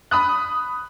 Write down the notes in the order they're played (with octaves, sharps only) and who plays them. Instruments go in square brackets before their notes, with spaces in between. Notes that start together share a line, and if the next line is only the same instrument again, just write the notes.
[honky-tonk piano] B5 D#6 F#6